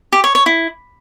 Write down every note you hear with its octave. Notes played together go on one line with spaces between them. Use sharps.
G4
C#5
C#5
E4